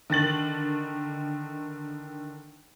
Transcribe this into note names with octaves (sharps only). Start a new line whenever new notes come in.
D3 D#3 A6 F#7